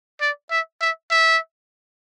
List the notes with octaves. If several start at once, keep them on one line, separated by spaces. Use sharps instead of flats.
D5
E5
E5
E5